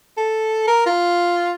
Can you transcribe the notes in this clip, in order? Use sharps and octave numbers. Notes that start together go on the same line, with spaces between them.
A4
A#4
F4